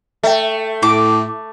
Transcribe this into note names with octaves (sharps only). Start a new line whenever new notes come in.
A3 E5 G5
A2 D6